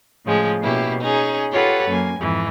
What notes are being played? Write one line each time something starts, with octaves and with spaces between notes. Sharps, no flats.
A2 C#3 F3 G#3
B2 A#3 C#4 E4 G4
C#4 D#4 G#4
F4 G4 A4 B4 C#5 F#5
F#2 A#3 G#5
F2 G#2 E3